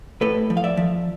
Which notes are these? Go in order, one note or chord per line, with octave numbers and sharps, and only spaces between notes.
A2 A4 B4
F3
F5
D5 E5
F3